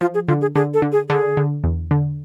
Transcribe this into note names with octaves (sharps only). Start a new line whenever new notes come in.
F3 F4
G#4
D3 F4
G#4
D3 G#4
A4
D3
G#4
D3 G#4
D3
E2
D3